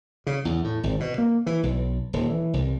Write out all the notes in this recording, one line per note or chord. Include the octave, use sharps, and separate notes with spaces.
C#3
E2
A2
G#1
B2
A#3
E3
B1
D#1
E3
C2